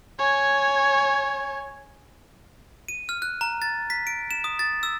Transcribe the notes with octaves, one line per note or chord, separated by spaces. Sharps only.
C#5 G#5
D#7
F6
F#6
A#5
A6
B6
D7
E7
D#6
A6
E6